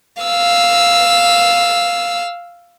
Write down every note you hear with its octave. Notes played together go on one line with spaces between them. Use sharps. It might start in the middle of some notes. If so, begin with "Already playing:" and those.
F5 E6